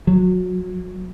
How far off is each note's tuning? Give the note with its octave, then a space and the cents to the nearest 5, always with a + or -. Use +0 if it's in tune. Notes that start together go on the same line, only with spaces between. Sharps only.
F#3 -25